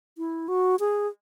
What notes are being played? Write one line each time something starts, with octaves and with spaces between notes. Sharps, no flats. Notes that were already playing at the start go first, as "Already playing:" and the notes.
E4
F#4
G#4